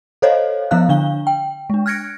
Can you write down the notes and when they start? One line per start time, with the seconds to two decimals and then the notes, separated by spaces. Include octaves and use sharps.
0.22 A4 C5 C#5 D#5 F5
0.71 F3 B3 E4 F5 F#6
0.89 D3 D4 F5 G7
1.27 G5
1.70 G#3 D4
1.86 F6 F#6 G#6 A#6 C#7 D7